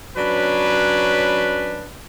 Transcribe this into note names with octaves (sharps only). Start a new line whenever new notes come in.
F#3 C#4 D4 B4